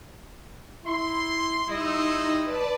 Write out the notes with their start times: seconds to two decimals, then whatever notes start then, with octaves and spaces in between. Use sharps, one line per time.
0.85 E4 C6
1.68 G3 D#4 E4 D#5 C6 E6
2.44 B4 D5 A5